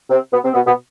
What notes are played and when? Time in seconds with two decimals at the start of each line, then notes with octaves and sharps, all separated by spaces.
0.10 C3 C4
0.33 B2 B3
0.44 C3 C4
0.54 B2 B3
0.66 B2 B3